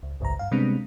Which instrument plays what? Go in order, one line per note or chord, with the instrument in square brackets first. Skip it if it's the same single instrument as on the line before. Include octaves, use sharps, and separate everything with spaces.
[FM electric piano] C#2
G#1 C#2 G2 A#5
G2 F5
C3 G3 G#3 B3 C4 D4